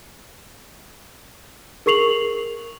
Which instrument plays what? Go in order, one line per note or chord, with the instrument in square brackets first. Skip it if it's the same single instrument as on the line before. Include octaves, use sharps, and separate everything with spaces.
[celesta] G#4 A#4 C#6 C7 F7 F#7